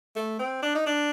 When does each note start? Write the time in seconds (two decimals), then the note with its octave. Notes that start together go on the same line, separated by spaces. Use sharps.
0.16 A3
0.39 C4
0.62 D4
0.75 D#4
0.86 D4